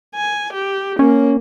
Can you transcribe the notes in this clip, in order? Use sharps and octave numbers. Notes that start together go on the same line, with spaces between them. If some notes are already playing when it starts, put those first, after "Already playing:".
G#5
G4
A#3 C#4